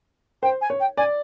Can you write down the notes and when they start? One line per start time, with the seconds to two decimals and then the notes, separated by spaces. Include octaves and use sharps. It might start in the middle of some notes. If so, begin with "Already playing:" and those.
0.42 C5 G5
0.61 G#5
0.70 C#5
0.80 G5
0.97 D5 G#5